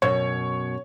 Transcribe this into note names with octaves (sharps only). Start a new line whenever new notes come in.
F#2 B2 C#5